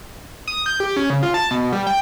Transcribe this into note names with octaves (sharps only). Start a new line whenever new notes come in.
D#6
G6
G4
C#4
C#3
F4
A5
B2
G3
G5